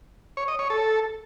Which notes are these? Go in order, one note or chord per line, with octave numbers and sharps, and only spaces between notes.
C#5
D#5
C#5
A4